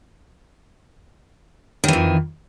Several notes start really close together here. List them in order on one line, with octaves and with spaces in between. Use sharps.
D#3 E3 F2